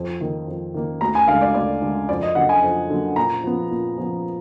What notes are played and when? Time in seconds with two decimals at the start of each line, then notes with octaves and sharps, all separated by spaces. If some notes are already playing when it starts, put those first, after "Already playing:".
Already playing: F2
0.20 D#3 A#3
0.48 F2
0.74 D#3 A#3
1.01 D2 A#5
1.15 G#5
1.28 D3 G#3 F5
1.41 D5
1.54 D2 D5
1.82 D3 G#3
2.09 F2 D5
2.22 D#5
2.35 D3 F#3 A#3 F#5
2.49 G#5
2.63 F2
2.90 D3 F#3 A#3
3.16 A#2 A#5
3.44 F3 B3
3.71 A#2
3.98 F3 B3